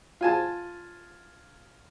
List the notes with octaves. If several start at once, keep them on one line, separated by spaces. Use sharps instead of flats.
F4 G#5 A5